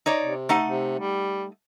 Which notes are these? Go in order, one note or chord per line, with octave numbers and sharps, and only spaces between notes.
D#4 C#5 D5
C3
A3 D#4 F#5
C3
G3